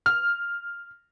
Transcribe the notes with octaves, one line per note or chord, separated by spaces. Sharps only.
F6